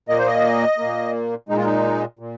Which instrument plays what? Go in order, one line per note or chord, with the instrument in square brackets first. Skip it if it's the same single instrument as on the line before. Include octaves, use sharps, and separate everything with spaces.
[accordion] A#2 A#3 D#5
C5
D#5
A#2 A#3
A#2 G#3 D#4
F4
D#4
A#2